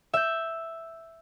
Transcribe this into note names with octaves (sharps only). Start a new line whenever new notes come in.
E5 G6